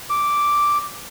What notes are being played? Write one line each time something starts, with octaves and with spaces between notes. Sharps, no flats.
D6